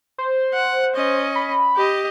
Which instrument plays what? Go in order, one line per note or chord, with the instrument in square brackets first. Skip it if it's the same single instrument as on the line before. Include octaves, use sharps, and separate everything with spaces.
[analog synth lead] C5
[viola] F#5
C#4 D#5
[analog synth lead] B5
[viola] G4 D#5